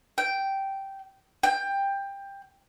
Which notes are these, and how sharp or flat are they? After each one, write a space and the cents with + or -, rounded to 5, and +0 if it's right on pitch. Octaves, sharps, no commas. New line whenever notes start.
G5 -10
G5 +15